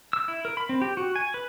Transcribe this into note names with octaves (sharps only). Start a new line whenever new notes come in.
E6
E4
A#4
B5
C4
G4
F#4
G#5
B4